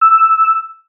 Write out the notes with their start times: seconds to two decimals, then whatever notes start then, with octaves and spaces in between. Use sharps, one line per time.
0.01 E6